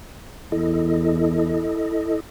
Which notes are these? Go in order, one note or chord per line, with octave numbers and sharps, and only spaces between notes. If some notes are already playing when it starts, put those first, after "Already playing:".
E2 E4 A4 D#5